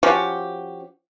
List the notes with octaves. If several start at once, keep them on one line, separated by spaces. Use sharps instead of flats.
F3 C#4 F#4 G4